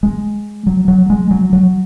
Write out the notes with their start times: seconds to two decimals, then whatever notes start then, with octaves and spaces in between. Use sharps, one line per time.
0.03 G#3
0.67 F#3
0.88 F#3
1.10 G#3
1.31 F#3
1.53 F#3